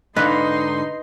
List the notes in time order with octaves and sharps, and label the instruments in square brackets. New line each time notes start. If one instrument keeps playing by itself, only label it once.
[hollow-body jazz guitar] G#2 D3 F5 [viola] D#4 C6 [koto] B4 [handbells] D#5